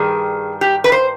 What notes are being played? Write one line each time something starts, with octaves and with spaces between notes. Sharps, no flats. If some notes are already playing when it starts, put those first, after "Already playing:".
Already playing: G2 D#3 G3 G#4
G4
B4
C5